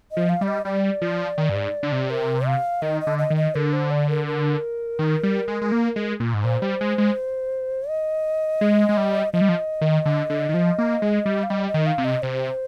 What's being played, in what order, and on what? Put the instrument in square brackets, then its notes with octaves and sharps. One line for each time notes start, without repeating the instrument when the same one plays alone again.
[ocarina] D#5
[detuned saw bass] F3
[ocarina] F5
[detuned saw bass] G3 [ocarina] D5
[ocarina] D#5
[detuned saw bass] G3 [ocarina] D5
[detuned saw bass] F3
D#3
G2
G#2
D3
C3
[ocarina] A#4
F5
[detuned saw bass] D#3 [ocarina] D#5
[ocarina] D#5
[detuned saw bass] D3
[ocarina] D#5
[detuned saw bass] D#3
[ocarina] D#5
[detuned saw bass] D3 [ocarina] A#4
[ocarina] C5
D5
A#4
A#4
[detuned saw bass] D#3
G3
G#3
G#3
A#3
G#3
A#2
G#2
[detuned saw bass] A#2 [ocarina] C5
[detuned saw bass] G3
G#3
G#3
[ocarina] D#5
[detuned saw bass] G#3
G#3
G3
[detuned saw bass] F3 [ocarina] D#5
[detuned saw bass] G3
F3
D#3
D3
D3
D#3
F3
A#3
G#3
G3
[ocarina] F5
[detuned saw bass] G3 [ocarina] D#5
[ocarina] D#5
[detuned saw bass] D#3
[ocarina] F5
[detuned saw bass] C3
[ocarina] D#5
[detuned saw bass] C3 [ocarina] C5